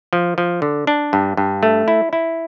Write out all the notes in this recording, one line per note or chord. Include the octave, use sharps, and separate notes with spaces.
F3
F3
D3
D4
G2
G2
A3
E4
E4